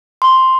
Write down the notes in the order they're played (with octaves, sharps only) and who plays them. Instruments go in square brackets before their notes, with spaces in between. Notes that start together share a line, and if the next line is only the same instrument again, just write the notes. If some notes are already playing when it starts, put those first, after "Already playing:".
[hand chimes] C6